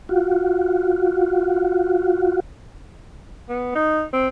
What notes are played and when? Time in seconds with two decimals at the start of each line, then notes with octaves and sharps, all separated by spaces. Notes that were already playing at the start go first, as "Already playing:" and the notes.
0.09 F4 F#4
3.49 B3
3.75 D#4
4.13 C4